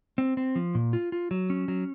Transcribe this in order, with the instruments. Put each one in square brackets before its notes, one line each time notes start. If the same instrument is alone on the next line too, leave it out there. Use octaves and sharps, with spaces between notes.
[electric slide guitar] C4
C4
F3
A#2
F4
F4
F#3
C#4
F#3